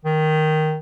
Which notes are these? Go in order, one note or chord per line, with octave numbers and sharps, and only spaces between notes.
D#3